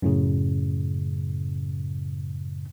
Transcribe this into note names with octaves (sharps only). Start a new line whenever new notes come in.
F#2 A2 C#3